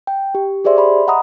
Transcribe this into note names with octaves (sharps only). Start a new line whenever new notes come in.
G5
G4
G4 G#4 C5 D5 E5 C6
E5 B5 C6
D#5 F#5 A#5 B5 D#6